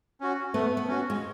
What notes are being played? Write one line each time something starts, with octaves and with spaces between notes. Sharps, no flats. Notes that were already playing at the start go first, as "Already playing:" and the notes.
C#4 F#4
A3 B3
B3
C#4 F#4
G#3